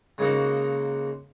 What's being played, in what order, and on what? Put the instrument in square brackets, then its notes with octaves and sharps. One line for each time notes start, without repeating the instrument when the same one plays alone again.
[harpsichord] C#3 G#3 A#3 D#4 F#4